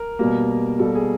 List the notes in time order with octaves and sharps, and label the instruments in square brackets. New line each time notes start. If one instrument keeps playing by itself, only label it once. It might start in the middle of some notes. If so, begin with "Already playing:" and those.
Already playing: [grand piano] A#4
B2 G3 A#3
B2 G3 A#3 A4
G#4